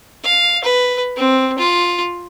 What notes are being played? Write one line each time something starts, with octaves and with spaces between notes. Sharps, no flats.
F5
B4
C4
F4